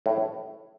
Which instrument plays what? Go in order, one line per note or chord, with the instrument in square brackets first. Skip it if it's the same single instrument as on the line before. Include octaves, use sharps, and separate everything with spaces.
[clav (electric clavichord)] A2